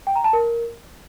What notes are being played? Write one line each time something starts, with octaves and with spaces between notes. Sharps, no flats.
G5
A#5
A5
A#4